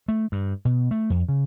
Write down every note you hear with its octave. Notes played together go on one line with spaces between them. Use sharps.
A3
G2
B2
A3
F2
C#3